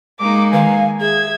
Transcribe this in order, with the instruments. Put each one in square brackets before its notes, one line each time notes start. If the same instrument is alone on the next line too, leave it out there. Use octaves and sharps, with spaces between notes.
[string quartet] G#3 A#3 D#4 [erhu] D6
[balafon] D#3 [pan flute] F5 [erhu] G#5
[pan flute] G#4 [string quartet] E5 [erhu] G#6